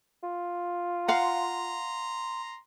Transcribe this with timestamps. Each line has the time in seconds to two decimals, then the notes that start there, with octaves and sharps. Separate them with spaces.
0.23 F4
1.08 F5 F#5 A#5 C6